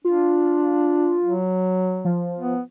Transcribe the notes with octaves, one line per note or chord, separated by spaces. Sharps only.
D4 F4
F#3
F3
B3